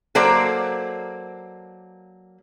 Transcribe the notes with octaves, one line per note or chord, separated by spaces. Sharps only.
F#3 A#3 A4 C5 D5